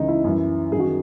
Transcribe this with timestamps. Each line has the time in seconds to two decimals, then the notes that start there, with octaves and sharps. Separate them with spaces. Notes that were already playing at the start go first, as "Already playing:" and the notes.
Already playing: C#2 C#3 E3 D#4
0.08 E4
0.24 F#2 E3
0.72 F#2 D#3 G#4
0.80 F#4